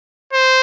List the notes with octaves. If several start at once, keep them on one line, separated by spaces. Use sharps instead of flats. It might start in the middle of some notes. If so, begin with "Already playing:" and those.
C5